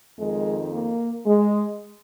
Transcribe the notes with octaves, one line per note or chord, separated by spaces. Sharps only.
F2 D#3 G#3
A#3
G#3